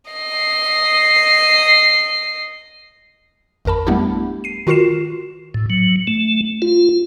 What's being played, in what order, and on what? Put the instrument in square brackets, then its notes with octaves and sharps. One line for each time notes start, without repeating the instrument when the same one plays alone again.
[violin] D#5 C7
[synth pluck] G#1 F2 A#4 A5 B5
G3 A3 B3 D4 E4 G4
C7 D#7
D#3 F4 F#4 A#4 C7 E7
[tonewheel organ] A2
F#3
A3
F4